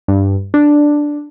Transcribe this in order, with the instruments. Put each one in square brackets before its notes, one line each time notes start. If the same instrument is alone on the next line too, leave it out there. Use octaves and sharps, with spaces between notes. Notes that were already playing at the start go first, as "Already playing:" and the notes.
[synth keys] G2
D4